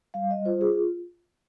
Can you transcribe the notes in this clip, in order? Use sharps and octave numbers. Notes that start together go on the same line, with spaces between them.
G3 F5
D#5
F4 C5
G#4